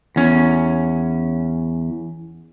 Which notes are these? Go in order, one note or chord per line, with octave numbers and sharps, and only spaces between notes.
E2 C#4